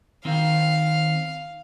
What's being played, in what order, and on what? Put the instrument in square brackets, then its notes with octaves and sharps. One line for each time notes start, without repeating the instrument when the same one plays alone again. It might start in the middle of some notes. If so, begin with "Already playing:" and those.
[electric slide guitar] D#3 C4 [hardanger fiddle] F5